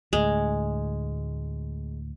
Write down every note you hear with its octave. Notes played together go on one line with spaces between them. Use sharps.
D2 A2 G#3